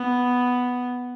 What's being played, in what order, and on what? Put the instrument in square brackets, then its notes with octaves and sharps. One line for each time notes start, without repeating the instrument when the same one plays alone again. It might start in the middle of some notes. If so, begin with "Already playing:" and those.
Already playing: [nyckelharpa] B3